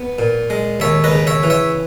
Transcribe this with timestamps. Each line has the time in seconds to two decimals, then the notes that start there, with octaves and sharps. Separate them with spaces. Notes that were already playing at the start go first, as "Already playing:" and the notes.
Already playing: B3
0.19 A#2
0.50 G#3
0.80 D#2 C#5 E5
1.04 B4 D#5
1.12 C#3
1.27 C#5 E5
1.43 E3
1.50 C#5 E5